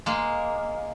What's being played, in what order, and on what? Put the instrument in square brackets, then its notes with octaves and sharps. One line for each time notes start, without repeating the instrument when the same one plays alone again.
[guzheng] G#3 A#3